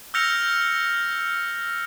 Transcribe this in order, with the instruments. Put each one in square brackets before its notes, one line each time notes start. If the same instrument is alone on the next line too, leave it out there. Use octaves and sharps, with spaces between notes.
[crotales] E6 F6 G6 A#6 C#7 F7